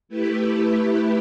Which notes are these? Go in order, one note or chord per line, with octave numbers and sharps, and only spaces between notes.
A3 E4 G4 B4